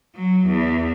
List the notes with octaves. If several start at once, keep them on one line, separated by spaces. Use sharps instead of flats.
F#3
E2